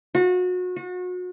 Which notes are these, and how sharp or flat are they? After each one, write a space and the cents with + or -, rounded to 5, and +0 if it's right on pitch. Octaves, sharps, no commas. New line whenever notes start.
F#4 -30
F#4 -35